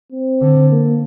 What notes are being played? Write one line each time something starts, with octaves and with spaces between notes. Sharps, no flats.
C4
D3
A#3